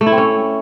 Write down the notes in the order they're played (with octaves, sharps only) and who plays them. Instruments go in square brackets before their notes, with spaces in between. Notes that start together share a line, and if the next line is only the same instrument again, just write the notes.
[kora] A3
E4
C4
C#4